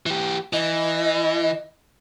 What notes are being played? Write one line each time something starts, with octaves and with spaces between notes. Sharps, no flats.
E3 G4
E3 D#5